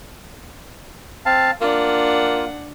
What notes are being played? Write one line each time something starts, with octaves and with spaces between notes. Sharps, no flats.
C4 F5 A5
A#3 D4 F4 F#5